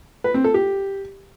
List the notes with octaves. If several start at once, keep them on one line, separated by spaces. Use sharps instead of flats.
B4
C4
A4
G4